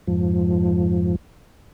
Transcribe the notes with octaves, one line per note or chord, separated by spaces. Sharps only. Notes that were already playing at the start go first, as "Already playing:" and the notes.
F2 G#2 F3